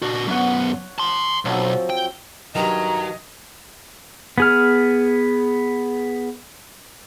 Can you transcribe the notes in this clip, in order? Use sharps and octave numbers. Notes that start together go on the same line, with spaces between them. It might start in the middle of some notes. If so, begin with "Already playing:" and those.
A#2 D4 F#4
F#2 B3 C#5 F#5
A5 C6
B1 F3 F#3 C4
G5
G2 D#3 F#3 D#5 A#5
B3 G#4 F6